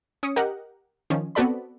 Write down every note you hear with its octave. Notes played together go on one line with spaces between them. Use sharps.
C#4 D#6 C#7
G4 A#4 D#5 F#5
D#3 F3 C#4
B3 C4 F#4 A4 D5 B5